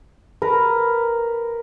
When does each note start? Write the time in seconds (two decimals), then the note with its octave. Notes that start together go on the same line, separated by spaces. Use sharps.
0.42 A#4 B4